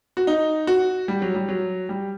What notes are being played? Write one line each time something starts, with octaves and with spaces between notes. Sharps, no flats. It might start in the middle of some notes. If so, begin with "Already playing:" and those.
F#4
D#4
F#4
G3
F#3
G3
F#3
G3